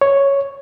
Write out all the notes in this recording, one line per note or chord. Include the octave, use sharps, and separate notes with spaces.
C#5